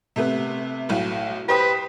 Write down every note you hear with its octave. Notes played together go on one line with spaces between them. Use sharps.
C3 A3 B3
B1 A2
G4 B4 C5 D#6